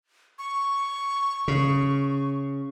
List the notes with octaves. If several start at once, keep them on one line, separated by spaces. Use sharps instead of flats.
C#6
C#3